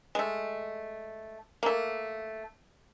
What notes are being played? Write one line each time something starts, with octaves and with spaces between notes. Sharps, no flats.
G#3 A3
A3 A#3